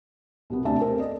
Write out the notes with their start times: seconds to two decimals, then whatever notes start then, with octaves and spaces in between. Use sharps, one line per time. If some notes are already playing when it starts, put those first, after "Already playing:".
0.50 C2 B2 B3
0.65 D2 C3 D4 E5 A5
0.80 C4 A4 A#4
0.99 D5 D#5